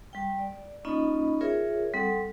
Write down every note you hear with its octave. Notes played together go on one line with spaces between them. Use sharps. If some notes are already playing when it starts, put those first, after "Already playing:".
G3 G5
D5
A#3 C#4 D#4 F4 D#5 B5
F4 G#4 A#4 C#5 E5
G3 C4 A4 F#5